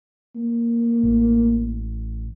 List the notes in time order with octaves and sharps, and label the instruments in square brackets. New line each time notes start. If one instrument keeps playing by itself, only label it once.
[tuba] A#3
[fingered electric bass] A1